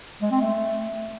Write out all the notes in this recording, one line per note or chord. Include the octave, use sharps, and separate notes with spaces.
G#3
C4
A3